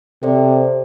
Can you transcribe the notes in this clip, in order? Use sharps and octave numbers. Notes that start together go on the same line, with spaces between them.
C3 A4 C5 D5